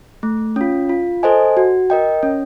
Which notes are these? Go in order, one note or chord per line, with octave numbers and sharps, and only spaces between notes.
A3
C#4 F4
F4
A4 C5 D#5 G#5
F#4
A#4 D#5 G5
C#4